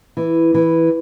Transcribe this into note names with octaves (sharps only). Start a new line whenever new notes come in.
E3
E3